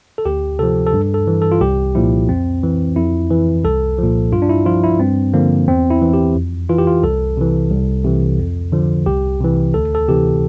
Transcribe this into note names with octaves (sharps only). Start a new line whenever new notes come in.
A4
D2 G4
C3 F3 A4
A4
G2
A4
E3
A4
F4
C2 G4
A#2 F3 E4
F2 C4
E3
F2 E4
E3
C2 A4
A#2 F3
G2 F4
D4
E4
F3 F4
E4
G2 C4
D3 F3 A#3
E2 C4
E4
E3
G4
F2
E3 F4
G4
F4
C2 A4
C3 E3
C2
C3 E3
F2
D3 F3
C2 G4
C3 E3
D2 A4
A4
C3 E3 G4